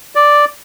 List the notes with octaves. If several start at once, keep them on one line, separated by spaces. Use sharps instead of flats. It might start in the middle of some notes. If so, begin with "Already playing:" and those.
D5